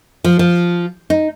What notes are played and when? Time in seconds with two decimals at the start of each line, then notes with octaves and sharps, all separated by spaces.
0.24 F3
0.39 F3
1.10 D#4